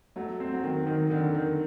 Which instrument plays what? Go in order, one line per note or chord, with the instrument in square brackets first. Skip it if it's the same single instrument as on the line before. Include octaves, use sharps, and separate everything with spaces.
[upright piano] F#3 [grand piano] A3
[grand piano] C4
[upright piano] F#3
[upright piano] D#3 [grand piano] C4
[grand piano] D#3
[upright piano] D3 [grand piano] D#3
[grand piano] D#3